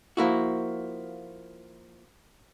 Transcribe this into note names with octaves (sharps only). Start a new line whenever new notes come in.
F3 A#3 E4 F#4